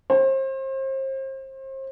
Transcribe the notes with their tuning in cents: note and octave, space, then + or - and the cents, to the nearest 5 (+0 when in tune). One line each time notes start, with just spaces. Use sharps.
C5 +35